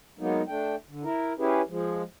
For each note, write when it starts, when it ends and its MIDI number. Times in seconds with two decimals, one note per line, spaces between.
0.19 0.42 54
0.19 0.42 56
0.19 0.42 58
0.19 0.42 59
0.19 0.42 63
0.48 0.75 57
0.48 0.75 62
0.48 0.75 79
0.88 1.04 50
1.04 1.33 64
1.04 1.33 70
1.39 1.62 61
1.39 1.62 64
1.39 1.62 67
1.39 1.62 68
1.39 1.62 71
1.69 2.03 53
1.69 2.03 56